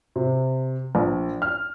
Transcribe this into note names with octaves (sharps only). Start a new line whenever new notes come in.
C3
A#1
F6